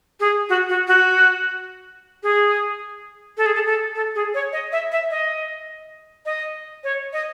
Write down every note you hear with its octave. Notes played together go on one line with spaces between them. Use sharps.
G#4
F#4
F#4
F#4
G#4
A4
G#4
A4
A4
A4
G#4
C#5
D#5
E5
E5
D#5
D#5
C#5
D#5